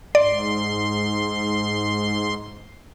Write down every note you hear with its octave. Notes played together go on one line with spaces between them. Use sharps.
G#2 D5 C6